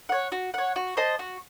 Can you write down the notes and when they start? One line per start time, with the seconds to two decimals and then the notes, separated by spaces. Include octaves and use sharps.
0.09 C#5 F#5
0.32 F#4
0.54 C#5 F#5
0.76 F#4
0.97 C5 D#5 A5
1.19 F#4